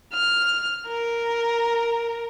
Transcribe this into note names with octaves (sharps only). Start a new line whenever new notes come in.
F6
A#4